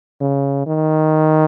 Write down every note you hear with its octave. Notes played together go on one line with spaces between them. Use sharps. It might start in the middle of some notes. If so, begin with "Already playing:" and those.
C#3
D#3